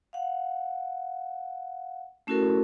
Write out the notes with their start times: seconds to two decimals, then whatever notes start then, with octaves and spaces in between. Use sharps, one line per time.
0.13 F5 F#5
2.27 A3 C#4 E4 F#4 A4 A#4